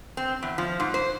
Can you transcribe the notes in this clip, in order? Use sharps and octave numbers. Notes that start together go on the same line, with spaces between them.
C4
E2
F3
G#2
C5